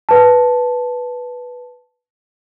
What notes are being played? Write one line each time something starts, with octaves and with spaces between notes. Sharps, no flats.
B4 A5